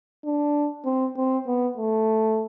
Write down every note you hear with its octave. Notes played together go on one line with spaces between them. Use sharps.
D4
C4
C4
B3
A3